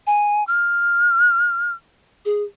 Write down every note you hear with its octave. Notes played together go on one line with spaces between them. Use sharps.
G#5
F6
G#4